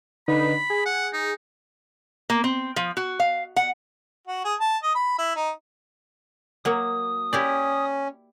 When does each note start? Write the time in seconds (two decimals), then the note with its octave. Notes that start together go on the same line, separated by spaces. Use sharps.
0.28 D3 D#4 B4 B5
0.70 G#4
0.86 F#5
1.13 D#4
2.30 A#3
2.44 C4
2.76 F3
2.97 F#4
3.20 F5
3.56 F#5
4.28 F#4
4.45 G#4
4.61 A5
4.83 D#5
4.95 B5
5.19 E4
5.36 D#4
6.65 F#3 A#3 D#6
7.33 C#4 E4 G4 D5